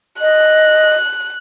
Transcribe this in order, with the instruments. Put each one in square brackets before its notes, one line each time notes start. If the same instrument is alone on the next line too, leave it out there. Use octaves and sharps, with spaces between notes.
[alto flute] D#5 [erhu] F#6